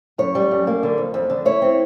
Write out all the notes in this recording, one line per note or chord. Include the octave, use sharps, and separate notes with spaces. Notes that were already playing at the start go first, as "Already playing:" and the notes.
F#2 C#5
G3
F#2
A#3
D3
F2
F2
D3
E4 C#5
C4